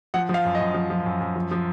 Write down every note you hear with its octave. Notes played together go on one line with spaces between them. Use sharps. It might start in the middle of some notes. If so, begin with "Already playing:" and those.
F3 F#5
F3
F5
F#2
D#5
F#2
F3
F3
F#2
F#2
F3
F3